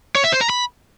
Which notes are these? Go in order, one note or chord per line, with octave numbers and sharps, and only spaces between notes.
C#5
E5
C5
A#5
B5